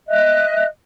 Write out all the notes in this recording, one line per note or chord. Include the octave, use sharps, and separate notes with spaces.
D#5 E5 F#6